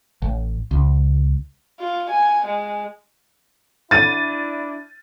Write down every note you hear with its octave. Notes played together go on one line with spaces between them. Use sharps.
A1
C#2
F4
G#5
G#3
D4 E4 A6 D#7